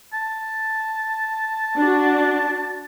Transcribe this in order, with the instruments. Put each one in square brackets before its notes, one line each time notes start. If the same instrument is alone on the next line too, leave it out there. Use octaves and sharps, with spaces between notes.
[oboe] A5
[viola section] D4 F#4